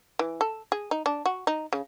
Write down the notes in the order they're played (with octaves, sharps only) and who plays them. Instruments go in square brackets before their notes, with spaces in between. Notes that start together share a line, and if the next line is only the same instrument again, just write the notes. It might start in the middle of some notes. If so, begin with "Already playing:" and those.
[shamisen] E3
A4
G#4
D#4
D4
F#4
D#4
C#3